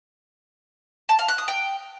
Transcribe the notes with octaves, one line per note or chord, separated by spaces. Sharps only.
A5
F5
F#6
D#6
G5